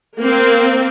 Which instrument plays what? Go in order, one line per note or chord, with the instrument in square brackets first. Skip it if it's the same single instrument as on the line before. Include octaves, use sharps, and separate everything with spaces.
[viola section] A#3 C4